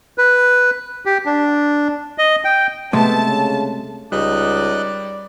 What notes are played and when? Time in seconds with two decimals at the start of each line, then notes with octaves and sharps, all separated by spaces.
0.18 B4
1.06 G4
1.26 D4
2.18 D#5
2.45 G5
2.93 C3 G#3 A3 B3 A5
3.26 C#3
4.12 C#2 G3 D#4 D5 D#5 F#6